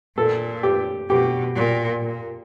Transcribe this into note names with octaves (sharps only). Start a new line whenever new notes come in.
A#2 A4
G4
B2 G4
A#2
A#2